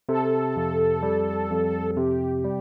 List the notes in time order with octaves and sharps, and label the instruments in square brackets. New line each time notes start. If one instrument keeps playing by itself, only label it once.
[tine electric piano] C3 [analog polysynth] A4
[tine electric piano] F2
G3
F2
[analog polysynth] A4
[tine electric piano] C3 [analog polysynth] G4
[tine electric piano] G3